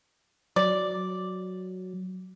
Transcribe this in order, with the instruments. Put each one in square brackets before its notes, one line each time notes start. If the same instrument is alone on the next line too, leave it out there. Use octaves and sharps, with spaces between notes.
[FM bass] F#3 [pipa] D5